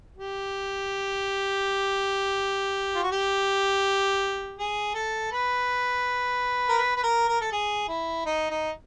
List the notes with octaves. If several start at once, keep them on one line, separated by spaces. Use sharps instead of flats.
G4
F4
F#4
G4
G#4
A4
B4
A#4
B4
B4
A#4
A#4
A4
G#4
E4
D#4
D#4